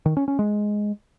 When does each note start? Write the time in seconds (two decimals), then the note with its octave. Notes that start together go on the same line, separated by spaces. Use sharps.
0.06 D#3
0.17 C#4
0.28 C#4
0.39 G#3